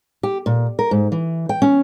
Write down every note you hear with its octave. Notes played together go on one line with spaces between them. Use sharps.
G4
A#2
A#4
G#2
E3
G5
C#4